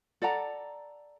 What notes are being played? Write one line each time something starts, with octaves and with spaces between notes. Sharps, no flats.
A4 D5 F#5 A#5